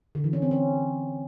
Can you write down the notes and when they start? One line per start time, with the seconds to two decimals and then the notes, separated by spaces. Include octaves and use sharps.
0.15 D3
0.24 E3
0.33 C#4
0.42 C4
0.51 C#4